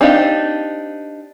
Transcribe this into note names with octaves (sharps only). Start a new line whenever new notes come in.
C4 D4 D#4 G4 F5